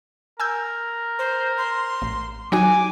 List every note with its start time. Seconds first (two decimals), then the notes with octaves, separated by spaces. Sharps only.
0.40 A#4 G#5 E6 G6
1.18 C5
1.57 C6
2.02 A1
2.52 F#3 D#4 F#4 G#5 D6